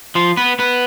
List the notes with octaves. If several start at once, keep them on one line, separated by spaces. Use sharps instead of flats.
F3 F4
B3 B4
B3 B4